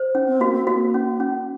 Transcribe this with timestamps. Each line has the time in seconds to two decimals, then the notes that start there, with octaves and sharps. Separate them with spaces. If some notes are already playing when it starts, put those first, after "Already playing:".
Already playing: C5
0.15 C#4
0.27 C4
0.40 A#3 F#4
0.52 C4
0.67 A#3 F#4
0.94 C#4
1.20 C#4